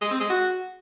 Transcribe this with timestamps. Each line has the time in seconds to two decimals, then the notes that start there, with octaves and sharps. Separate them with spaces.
0.01 G#3
0.11 C4
0.20 G#3
0.30 F#4